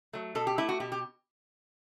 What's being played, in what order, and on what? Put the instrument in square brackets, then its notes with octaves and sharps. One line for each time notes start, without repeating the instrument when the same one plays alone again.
[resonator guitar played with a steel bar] F#3 A3
B2 A4
G4
A3 E4
F#4
B2 G4
G4